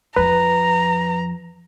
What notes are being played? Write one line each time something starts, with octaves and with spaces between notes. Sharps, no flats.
F2 F3 B4 A#5